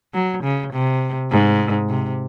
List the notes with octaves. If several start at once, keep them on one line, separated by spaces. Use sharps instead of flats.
F#3
C#3
C3
G#2
C3